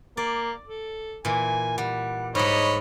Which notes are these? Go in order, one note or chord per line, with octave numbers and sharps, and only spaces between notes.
A#3 D5
A4
A#2 E3 G#5
G3 F#5
G#2 G3 D#4 C#5 D#5 B5